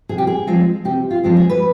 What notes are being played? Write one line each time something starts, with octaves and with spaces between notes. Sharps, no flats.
C3 G#4
G4
G#4
F3 G#3 C4
C3 G4
F4
F3 G#3 C4
G#4
B4